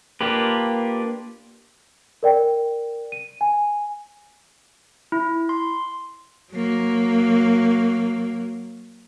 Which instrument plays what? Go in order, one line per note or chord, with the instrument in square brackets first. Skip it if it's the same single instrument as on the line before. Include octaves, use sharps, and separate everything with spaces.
[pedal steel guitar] A#3 D4 F4 G4 B4
[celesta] A#4 D5 G5
D#7
G#5
[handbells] E4
C6
[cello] F#3 A#3